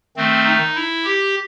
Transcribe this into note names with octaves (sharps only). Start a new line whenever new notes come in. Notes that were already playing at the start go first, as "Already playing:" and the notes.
D#3 A3 C4
D#4
E4
G4